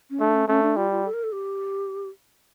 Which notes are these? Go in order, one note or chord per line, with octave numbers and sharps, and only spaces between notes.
C#4
A3 D4
C#4
A3 C#4
D4
G3 F4
F4
A4
A#4
A4
G4